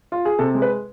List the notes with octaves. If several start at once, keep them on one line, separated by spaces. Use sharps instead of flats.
F4
G#4
C3 A4
G#3
B4